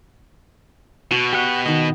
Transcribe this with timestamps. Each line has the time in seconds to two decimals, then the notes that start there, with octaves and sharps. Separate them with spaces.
1.11 B2 F#4
1.33 G4 F#5
1.66 D#3 B3 D#5